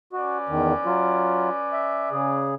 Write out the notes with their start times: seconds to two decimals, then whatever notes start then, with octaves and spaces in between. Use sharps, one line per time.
0.13 C#4 F#4 B4 D5
0.49 E2 D#3
0.86 F#3 F4
1.73 E5
2.11 C#3 G#4